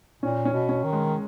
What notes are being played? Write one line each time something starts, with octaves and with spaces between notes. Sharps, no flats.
A#2 C#4
C#4
B2
C#4
D#3
G#3